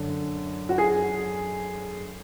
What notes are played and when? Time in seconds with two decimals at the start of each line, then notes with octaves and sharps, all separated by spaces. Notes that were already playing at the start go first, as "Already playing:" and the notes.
Already playing: F#2 D3
0.69 F#4
0.78 G#4